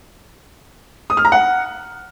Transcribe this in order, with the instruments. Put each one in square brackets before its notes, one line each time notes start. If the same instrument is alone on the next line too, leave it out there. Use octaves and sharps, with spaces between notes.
[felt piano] D#6
F6
A#5
F#5